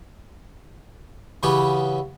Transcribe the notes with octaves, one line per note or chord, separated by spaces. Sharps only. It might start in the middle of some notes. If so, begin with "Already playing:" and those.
C#3 E3 B3 F#4 G4